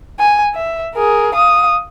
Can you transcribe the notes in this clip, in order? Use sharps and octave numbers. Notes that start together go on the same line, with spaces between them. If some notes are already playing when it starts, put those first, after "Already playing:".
G#5
E5
G#4 A#4
F5 D#6